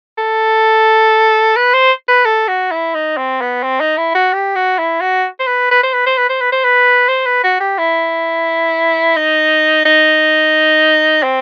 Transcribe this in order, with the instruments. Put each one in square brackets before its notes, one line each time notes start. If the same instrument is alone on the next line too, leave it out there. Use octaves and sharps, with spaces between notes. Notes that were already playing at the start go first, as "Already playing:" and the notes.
[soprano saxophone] A4
B4
C5
B4
A4
F#4
E4
D#4
C4
B3
C4
D#4
E4
F#4
G4
F#4
E4
F#4
C5
B4
B4
C5
B4
C5
B4
C5
B4
C5
B4
C5
B4
F#4
G4
E4
D#4
D#4
C4